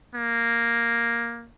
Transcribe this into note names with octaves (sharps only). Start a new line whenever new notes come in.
A#3